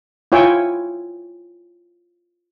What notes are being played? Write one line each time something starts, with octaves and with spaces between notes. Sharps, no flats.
E4 F4 C#5 G5 G#5 E6